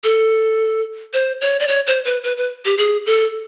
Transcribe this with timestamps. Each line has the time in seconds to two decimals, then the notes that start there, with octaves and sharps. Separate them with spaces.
0.04 A4
1.13 C5
1.41 C#5
1.60 D5
1.68 C#5
1.87 C5
2.05 B4
2.24 B4
2.37 B4
2.65 G4
2.78 G#4
3.06 A4